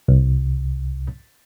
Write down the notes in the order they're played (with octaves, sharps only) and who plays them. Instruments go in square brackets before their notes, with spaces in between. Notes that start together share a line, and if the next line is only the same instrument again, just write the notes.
[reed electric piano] C2